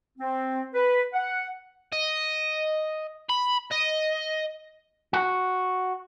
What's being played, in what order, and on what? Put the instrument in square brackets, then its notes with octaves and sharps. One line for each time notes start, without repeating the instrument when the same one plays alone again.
[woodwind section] C4
B4
F#5
[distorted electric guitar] D#5
B5
D#5
[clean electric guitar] F#4